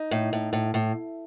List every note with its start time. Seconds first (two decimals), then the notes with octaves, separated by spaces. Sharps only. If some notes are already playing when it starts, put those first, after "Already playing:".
Already playing: D#4
0.11 A2
0.33 A2
0.53 A2
0.74 A2